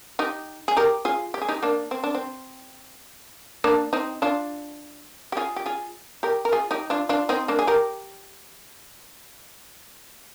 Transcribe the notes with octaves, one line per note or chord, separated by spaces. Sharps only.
D#4 G4
G#4
G4 A#4
F4 G#4
G4
G#4
D#4 G4
A#3 D4
C4
D4
C4
A#3 D4
C4 D#4
D4 F4
G4
F4 G#4
G4
F4 G#4
G4 A#4
A#4
F4 G#4
D#4 G4
D4 F4
D4 F4
C4 D#4
A#3 D4
G#4
G4 A#4